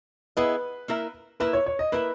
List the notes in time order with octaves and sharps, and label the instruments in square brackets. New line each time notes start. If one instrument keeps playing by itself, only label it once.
[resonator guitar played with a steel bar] B3 E4 G#4 D#5 [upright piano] B4
[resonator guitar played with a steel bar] A#3 E4 A#4 E5
[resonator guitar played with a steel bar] A#3 E4 A#4 E5 [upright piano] B4
[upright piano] C#5
C#5
D#5
[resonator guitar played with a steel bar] A#3 E4 A#4 E5 [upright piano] B4